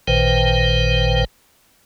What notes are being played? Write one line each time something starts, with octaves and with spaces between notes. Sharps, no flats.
A1 A#2 D#3 B4 C5 G5